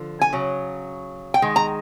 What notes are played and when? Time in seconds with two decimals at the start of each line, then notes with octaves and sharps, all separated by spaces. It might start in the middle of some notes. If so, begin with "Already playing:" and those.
Already playing: D3 F3
0.21 G#5
0.33 C#3 F#3
1.34 G5
1.42 D#3 G#3
1.56 A#5